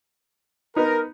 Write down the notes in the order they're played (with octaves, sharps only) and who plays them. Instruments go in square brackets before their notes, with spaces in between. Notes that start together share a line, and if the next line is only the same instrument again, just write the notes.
[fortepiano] B3 D#4 [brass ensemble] A#4